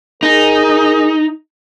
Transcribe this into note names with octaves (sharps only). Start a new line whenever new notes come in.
D#4 G#4 A#4